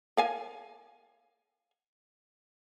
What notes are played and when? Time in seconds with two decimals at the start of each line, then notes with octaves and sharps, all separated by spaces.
0.17 A#4 F5 G#5